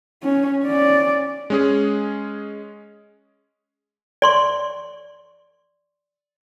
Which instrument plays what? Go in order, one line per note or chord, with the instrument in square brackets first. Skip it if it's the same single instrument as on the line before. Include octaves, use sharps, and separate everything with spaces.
[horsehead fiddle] C#4
C#4 D5
[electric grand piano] G#3 C#4 G#4
[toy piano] D5 C6 C#6